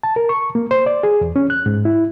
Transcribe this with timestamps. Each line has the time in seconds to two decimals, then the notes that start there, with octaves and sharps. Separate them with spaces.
0.03 A5
0.16 A#4
0.29 C#6
0.55 A#3
0.71 C5
0.86 D5
1.03 G#4
1.21 E2
1.36 C#4
1.50 F#6
1.66 G#2
1.85 E4